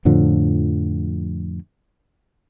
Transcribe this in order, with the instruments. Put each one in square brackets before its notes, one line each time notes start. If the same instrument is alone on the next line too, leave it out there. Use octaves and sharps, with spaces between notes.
[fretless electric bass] F2 A2 D3 F3